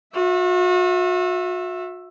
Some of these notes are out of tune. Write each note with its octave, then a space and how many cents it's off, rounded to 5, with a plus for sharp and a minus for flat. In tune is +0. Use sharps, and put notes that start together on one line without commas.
F#4 -40 E5 +5